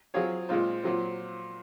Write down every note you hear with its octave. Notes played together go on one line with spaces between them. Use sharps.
F#3 C4 F4 G#4 C#5
A#2 G#3 C4 F4 C5
A#2 F#3 C4